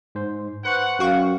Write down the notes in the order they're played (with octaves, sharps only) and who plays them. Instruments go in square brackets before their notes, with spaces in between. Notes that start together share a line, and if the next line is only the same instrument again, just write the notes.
[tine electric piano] G#2 C5
[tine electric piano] B4 C5 C#6 [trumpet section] F#5
[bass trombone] F#2 [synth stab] F#4 F5 C#6 [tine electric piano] G5